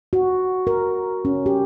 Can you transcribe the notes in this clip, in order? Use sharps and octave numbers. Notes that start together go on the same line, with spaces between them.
F#4
A#4
C#4
G4